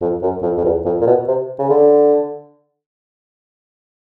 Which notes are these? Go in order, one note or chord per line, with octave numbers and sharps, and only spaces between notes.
F2
F#2
F2
F2
E2
F2
A#2
B2
C3
C#3
D3